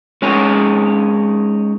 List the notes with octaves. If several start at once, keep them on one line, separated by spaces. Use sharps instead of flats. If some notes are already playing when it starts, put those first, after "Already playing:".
G#3 C#4 D#4 G#4 A#4 C#5